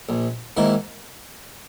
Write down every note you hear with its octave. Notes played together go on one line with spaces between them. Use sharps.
A#1
G#2 D#3 A#3 E4